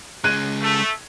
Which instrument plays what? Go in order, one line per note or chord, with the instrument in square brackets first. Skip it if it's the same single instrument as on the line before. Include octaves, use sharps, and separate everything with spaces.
[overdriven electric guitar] C#3 G#3 [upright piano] F#6 G#6 D#7
[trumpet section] A3